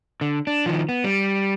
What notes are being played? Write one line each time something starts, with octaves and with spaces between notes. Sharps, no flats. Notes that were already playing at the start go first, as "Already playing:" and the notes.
D3
D4
D#3 F3
B3
G3